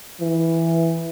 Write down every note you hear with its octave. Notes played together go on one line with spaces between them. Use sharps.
E3